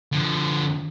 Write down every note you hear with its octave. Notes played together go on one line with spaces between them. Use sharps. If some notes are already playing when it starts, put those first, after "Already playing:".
D3 F3